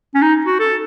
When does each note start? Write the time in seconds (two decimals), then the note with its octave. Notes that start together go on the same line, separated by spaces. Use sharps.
0.15 C#4
0.22 D#4
0.47 F#4
0.60 A4